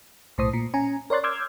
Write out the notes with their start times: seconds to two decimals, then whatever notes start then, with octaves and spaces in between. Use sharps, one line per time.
0.38 B1 A2 C5 D#6
0.53 A#2
0.74 C#4 G#5 A#5
1.10 A#4 C#5 D5 C6 F#6 A6
1.24 C6 D6 E6 F6 G6 G#6